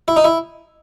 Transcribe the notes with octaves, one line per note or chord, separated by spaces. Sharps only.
E4
D#4
E4